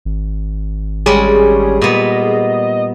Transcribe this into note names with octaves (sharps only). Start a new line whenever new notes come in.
G#1
G3 G#3 C#4 G#4
A#2 B3 D#5